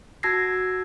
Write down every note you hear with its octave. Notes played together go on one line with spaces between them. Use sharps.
F#4 A5 E6 G#6 A#6 C7